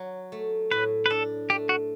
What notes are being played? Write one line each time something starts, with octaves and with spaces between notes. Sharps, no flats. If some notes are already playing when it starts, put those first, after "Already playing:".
Already playing: F#3
A3
A2 B4
B4
D4 A4
A3 G4
F#4